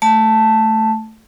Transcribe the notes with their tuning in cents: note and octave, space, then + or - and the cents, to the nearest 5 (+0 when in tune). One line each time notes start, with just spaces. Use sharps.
A3 +0 A5 +0